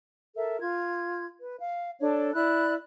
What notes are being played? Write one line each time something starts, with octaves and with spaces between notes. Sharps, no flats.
A4 A#4 E5
F4 G#6
B4
F5
D4 A4 C#5
E4 D5 B5 F#6